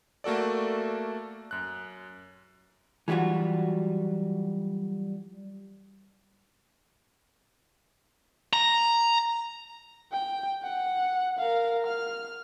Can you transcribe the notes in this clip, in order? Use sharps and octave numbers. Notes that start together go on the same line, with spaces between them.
A3 A#3 F#4 A4 D5
F#2 F#6
E3 F#3 G3 F4 F#4
A#5
G5
F#5
A#4 F5
F6